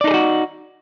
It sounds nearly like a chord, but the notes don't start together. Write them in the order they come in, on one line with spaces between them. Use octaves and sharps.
D5 D#4 A4 G#4 F#4